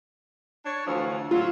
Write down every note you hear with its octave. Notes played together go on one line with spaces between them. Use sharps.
D4 C#5
D2 E3 F3
F#3 F4